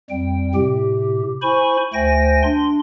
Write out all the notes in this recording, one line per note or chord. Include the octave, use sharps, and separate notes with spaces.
F2 G3 G5
A2 C3 G4
E4 C5 G#5 B5 C#6
D2 A3 C5 G5 G#5 A#6
D4 C6